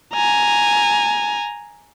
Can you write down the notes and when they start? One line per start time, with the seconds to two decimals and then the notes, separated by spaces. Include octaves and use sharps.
0.14 G#5 A#5